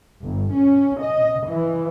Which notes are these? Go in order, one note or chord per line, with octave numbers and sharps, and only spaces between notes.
G1
C#4
D#5
E3